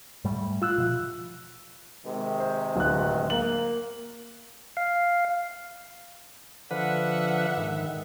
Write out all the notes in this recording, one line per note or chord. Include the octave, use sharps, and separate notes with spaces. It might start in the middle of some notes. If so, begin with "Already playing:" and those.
G#2 G3 A3
F4 E6 F#6
B2 F3
C3 D#3 G#3
C5
D1 F#6
A#3 F#7
F5
D3 F3 B4 E5 F#5
G#2 D#3